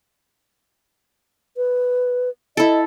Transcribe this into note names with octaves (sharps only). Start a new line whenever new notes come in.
B4
E4 A4 D#5